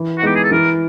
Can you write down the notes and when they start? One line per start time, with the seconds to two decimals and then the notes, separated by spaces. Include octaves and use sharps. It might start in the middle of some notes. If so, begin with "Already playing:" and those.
Already playing: E3
0.18 F#4
0.22 G#3 B3 D#4 G4
0.35 G#4
0.44 A4
0.51 E3 A#4